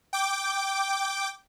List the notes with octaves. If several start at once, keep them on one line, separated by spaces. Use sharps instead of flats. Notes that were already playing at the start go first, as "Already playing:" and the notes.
G5 D6